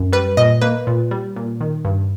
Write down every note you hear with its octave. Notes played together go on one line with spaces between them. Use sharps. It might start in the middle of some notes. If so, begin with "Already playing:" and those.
Already playing: F#2
G3 B4
A#2 D#5
A#3 B4
A#2
G3
A#2
D#3
G2